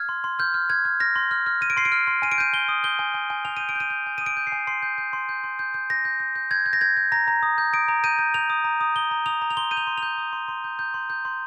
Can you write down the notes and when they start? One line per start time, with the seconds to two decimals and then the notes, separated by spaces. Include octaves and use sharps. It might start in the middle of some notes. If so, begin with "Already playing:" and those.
Already playing: F6 G#6
0.09 C6
0.24 C6
0.39 F6 G6
0.54 F6
0.70 F6 G#6
0.85 F6
1.00 F6 A#6
1.16 C6
1.31 F6
1.46 F6
1.61 F6 D#7
1.70 D7
1.77 C6 C7
1.85 D7
1.92 F6
2.07 C6
2.22 G#5 D#7
2.32 D7
2.38 G6 D#7
2.53 G#5 G7
2.69 D#6
2.84 G6 G7
2.99 G#5
3.14 G#5
3.30 G#5
3.45 G#5 F7
3.57 G6 D#7
3.69 D7
3.75 G6 D#7
3.90 G6
4.06 G#5
4.18 D#6 D#7
4.26 D7
4.37 G6
4.47 C7
4.52 G#5
4.67 C6 C7
4.82 G6
4.98 G6
5.13 C6
5.29 G6
5.44 C6
5.59 G6
5.74 G6
5.90 G6 A#6
6.05 G6
6.20 G6
6.36 G6
6.51 G6 G#6
6.66 G6
6.73 A#6
6.81 G6 G#6
6.97 G6
7.12 A#5 A#6
7.28 A#5
7.43 D#6
7.58 G6
7.73 D#6 D7
7.88 A#5
8.04 G6 D#7
8.19 G6
8.34 G6 F7
8.50 D#6
8.64 A#5
8.81 D#6
8.96 D#6 G7
9.11 A#5
9.26 D#6 F7
9.42 A#5
9.50 F7
9.57 C6 G7
9.71 G6 D#7
9.77 F7
9.87 C6
9.98 F7
10.03 G6
10.18 D#6
10.33 C6
10.48 C6
10.64 G6
10.79 G6
10.94 C6
11.10 G6
11.25 C6